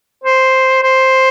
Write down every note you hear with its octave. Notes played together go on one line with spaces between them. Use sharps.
C5
C5